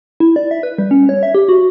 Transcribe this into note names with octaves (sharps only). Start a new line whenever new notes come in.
E4
D5
E5
B4
G3
C#4
C#5
E5
G4
F#4